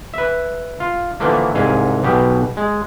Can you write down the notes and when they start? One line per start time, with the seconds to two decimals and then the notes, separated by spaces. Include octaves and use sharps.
0.14 B4 E5
0.80 F4
1.20 D3 E3 F3 A3 A#3
1.55 C2 G#2 F5 G#5
2.03 B1 B2 G4
2.57 G#3